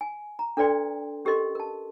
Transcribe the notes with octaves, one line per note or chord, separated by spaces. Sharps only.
G#5
A#5
D4 A4 B4 D5 G5 C6
C#4 G4 A4 A#4 D#5 C6
A#4 A5